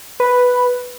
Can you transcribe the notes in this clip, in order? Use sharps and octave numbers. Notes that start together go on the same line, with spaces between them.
B4